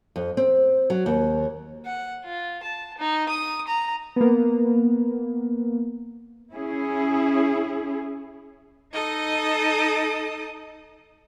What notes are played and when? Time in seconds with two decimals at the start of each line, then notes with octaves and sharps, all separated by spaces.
0.16 F2
0.37 C4
0.90 F#3
1.06 D#2
1.86 F#5
2.25 F4
2.63 A5
2.98 D#4
3.29 D#6
3.68 A#5
4.16 A#3 B3
6.53 C#4 E4 G#4
8.93 D#4 A4 D#5 D#6